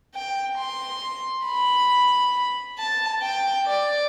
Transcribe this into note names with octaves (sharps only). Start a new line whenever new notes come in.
G5
C6
B5
A5
G5
D5